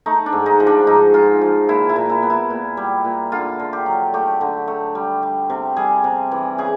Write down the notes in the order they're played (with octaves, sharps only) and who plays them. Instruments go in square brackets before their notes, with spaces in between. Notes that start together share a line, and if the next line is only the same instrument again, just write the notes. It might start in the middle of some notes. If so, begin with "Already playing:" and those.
[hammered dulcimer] A3 D#4
D4
G#2
D#4
F3
D4
G#2 D#4
G#2 F4
F3
A#2 E4
E4
A#2
E4
B3
E4
A#2
G3
A#2
D3 F4
D3
G4
F#3
A3 G4
D3
A3
G3
G3
C3
G3 G#4
C3
E3
C#3 G#4